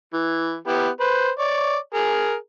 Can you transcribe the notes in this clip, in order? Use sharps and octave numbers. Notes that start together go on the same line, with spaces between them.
E3
B3 E4 G4
B4 C5
C#5 D5
G#4 A#4